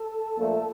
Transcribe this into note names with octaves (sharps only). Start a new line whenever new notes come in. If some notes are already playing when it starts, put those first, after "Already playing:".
Already playing: A4
A#1 A#2 A3